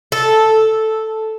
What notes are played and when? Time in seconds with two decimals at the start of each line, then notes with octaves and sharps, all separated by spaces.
0.12 A4